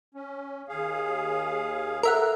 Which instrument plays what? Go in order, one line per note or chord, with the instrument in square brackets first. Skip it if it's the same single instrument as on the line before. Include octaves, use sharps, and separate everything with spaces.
[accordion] C#4
D#2 G#4 F5
[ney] A4 [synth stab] A#4 E5 F#5